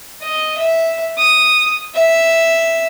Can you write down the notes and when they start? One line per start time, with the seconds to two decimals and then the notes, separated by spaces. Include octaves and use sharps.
0.23 D#5
0.58 E5
1.18 D#6
1.95 E5